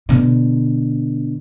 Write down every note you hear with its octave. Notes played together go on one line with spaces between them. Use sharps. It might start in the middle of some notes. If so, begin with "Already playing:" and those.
B2 D3